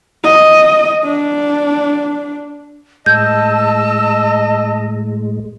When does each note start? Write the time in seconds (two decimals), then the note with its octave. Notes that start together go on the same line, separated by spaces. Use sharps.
0.23 D#5
1.04 D4
3.06 A2 G#3 D#5 A5 E6 G6